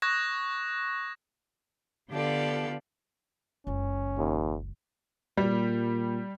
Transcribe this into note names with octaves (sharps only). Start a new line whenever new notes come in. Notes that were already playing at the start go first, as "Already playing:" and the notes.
C#6 D#6 F#6 G#6 A#6 E7
D3 B3 F4 G4 A4 D5
F#1 C#2 C#4
D#2
A#2 G3